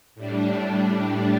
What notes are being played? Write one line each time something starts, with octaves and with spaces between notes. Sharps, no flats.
A2 G3 D4